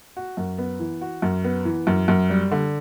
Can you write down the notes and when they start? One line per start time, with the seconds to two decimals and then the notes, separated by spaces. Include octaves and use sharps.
0.17 F#4
0.37 F#2
0.58 B3
0.79 E3
1.01 F#4
1.22 F#2
1.44 B3
1.65 E3
1.87 F#2
2.08 F#2
2.30 G3
2.52 D3